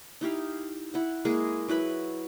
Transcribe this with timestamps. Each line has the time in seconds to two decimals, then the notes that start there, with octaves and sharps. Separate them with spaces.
0.21 D#4 E4 G4 F5
0.94 E4 F#5
1.25 G#3 A#3 E4 G#4
1.68 F#3 E4 B4 B5